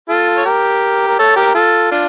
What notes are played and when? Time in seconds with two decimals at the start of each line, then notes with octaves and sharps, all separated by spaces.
0.09 F4 A4
0.37 C#5
0.45 G4 A#4
1.08 A#4
1.19 A4 C#5
1.36 G4 A#4
1.54 F4 A4
1.91 D4 F4